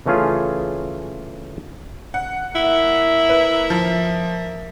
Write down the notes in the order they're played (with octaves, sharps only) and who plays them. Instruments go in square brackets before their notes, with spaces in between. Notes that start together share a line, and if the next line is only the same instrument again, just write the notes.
[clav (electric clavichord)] C#3 E3 A3 C#4 F4 G#4
[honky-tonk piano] F#5
[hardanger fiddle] A#3 E5 [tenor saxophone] E4
[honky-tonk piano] B4
F3